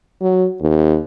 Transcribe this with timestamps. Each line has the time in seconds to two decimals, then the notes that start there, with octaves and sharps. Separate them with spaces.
0.21 F#3
0.61 D#2